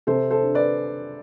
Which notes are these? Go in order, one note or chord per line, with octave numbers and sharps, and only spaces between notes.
C3 A4 C5
A4 C5
D4
B4 D5